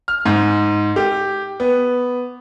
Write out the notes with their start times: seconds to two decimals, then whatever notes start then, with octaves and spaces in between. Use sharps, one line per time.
0.08 F6
0.26 G#2
0.96 G4
1.60 B3